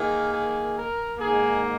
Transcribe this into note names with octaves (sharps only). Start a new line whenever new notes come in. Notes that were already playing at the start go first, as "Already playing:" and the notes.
Already playing: D#3 A#3 G#4
G#4
A#4
G#2 D#3 A#3 G#4